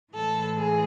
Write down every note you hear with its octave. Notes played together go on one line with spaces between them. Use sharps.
A2 E3 G#3 A4
G#4